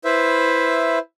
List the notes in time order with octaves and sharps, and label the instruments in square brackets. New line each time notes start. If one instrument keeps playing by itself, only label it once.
[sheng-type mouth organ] E4 B4 C5 E5